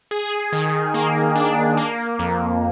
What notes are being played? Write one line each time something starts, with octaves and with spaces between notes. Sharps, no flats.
G#4
D#3
A#3
D4
A#3
F2